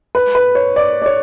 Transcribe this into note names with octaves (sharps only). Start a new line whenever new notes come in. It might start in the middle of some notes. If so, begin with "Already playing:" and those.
B4
B4
C#5
D5
D5
C#5